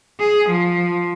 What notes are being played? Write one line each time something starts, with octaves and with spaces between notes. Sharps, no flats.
G#4
F3